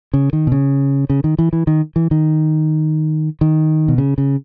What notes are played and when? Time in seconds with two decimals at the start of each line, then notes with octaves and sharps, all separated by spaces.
0.14 C#3
0.33 D#3
0.47 B2
0.52 C#3
1.10 C#3
1.24 D#3
1.39 E3
1.53 E3
1.67 D#3
1.96 E3
2.11 D#3
3.41 D#3
3.88 B2
3.98 C#3
4.18 C#3